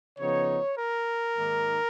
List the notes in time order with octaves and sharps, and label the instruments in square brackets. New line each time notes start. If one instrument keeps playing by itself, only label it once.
[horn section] C#3 F3 B3 D#4 C#5
A#4
G#2 D#3 A#3 D#4